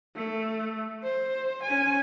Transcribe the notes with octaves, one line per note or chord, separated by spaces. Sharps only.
A3
C5
C#4 G#5